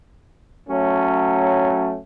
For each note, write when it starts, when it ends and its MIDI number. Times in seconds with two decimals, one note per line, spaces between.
0.68 1.99 54
0.68 1.99 57
0.68 1.99 61